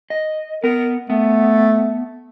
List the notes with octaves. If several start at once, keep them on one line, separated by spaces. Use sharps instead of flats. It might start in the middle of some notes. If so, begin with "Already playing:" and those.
D#5
B3 A#4
A3 B3